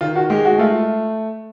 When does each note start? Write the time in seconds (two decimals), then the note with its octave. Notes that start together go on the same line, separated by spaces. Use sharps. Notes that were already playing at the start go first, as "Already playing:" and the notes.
0.01 D#3 F4
0.16 F#4
0.30 G#3 G4
0.45 F#4
0.58 A3 F4